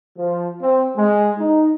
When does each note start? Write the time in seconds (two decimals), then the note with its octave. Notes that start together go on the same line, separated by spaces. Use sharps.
0.17 F3
0.61 C4
0.97 G#3
1.38 D#4